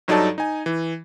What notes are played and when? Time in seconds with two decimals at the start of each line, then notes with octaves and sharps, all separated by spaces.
0.08 G2 F#3 D#4 A4 D5 A5
0.38 D#4 G#5
0.66 E3